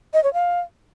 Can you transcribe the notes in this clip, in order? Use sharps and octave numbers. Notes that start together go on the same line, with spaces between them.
D#5
C#5
F5